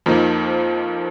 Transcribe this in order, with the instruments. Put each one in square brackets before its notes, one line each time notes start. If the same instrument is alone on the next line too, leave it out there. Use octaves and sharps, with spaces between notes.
[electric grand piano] F2 F3 A#3 D#4